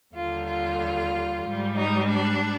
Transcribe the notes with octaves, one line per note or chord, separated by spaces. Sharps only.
D#2 D3 G3 F4
F4
G#2 G3
D#4
D4